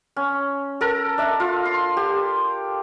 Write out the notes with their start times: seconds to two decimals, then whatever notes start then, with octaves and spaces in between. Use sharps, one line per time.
0.16 C#4
0.81 A4 A#4
1.18 D4 E5
1.40 F4
1.65 C6
1.97 G4